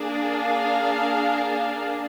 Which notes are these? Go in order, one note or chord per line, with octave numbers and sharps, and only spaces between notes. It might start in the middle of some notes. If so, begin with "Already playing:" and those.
Already playing: A#3 D4 G#4
F5